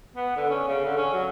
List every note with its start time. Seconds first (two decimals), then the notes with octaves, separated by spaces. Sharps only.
0.16 B3
0.37 D3
0.50 C#4
0.67 C#3
0.85 D3
0.97 C#4
1.14 F#3